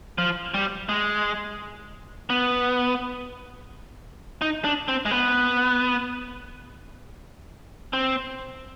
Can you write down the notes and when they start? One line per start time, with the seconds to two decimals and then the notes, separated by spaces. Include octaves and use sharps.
0.18 F3
0.54 G3
0.89 G#3
2.30 B3
4.42 D#4
4.64 D4
4.88 C4
5.06 G#3
5.11 B3
7.93 C4